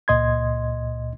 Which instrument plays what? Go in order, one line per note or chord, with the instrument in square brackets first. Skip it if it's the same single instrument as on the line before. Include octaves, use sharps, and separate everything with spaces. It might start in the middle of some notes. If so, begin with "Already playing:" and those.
[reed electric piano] C#2 A#2 D#5 C6 G#6